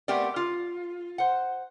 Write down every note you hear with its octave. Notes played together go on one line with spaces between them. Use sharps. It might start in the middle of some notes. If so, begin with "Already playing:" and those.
A3 B3 C4 G4 A#4 D5
F4
C5 F#5